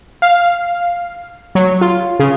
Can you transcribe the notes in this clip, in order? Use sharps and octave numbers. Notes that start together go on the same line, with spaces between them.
F5
F#3
F4
C#3